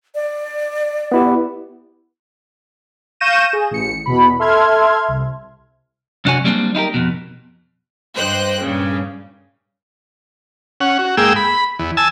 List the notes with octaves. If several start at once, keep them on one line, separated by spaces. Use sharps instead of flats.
D5
B3 E4 G4
F5 C#6 G6 A#6 D#7 E7
G#4
A1 C#7
E2 B2 B5
A4 E5 C6 F6 G#6
C2
F#2 C3 D4 F#4 C#5 G#5
F#3 G3 A#3 C4 D4
D#4 E4 G4 A#4
F2 B2
G2 C5 D#5 G5 F#6
G2 A#2 C#3
C#4 F#5
F#4
G#2 A#3 G#4 G5 E6
B5
E2
G#5 A5 E6